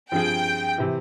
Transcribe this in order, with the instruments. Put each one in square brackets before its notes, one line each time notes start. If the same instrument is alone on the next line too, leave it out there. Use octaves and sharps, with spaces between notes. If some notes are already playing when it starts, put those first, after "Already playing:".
[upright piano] G2 F3 C4 F4 G#4 [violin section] G5
[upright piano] C3 E3